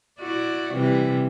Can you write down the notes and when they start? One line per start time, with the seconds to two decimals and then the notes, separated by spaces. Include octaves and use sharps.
0.20 E4 F#4 D5
0.74 C3 E3 G3